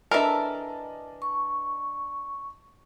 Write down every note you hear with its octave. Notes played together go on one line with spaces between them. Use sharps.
E3 D4 A4 A#4 D#5 E5 A5
C#6